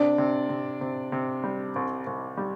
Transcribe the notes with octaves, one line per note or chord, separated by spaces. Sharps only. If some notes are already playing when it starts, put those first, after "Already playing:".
Already playing: C3 D4 D5
C3
C3
C3
C3
G3
C2
C2
G3